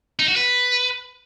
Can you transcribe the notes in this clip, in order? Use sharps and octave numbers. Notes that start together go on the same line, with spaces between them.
D#4
F#4
B4